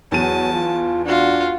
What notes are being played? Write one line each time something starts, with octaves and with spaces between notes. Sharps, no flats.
E2 F#3 A5 D#7
F4
D4 F4 F#4